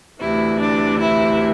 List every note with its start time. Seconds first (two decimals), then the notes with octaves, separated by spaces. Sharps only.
0.20 D2 C3 E3 E4
0.60 D4
0.99 E4